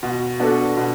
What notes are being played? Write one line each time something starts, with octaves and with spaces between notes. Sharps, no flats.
B2
B3 D4 F#4 A4
B2